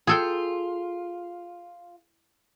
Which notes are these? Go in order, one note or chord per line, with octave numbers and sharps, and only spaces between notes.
F4 G#4 A4 G5